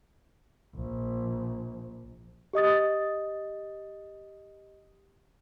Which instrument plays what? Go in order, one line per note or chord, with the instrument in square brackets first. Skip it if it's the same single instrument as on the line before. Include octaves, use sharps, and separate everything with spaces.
[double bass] A#1
[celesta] G4 D#5 D#6 A6